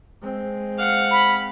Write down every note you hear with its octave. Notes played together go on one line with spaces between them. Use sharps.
G#3 C4
F5 F#5
B5